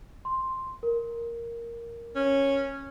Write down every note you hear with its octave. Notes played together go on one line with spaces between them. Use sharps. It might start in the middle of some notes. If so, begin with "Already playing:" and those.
C6
A#4
C#4